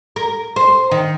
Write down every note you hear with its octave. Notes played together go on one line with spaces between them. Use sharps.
A#4
C5
D#3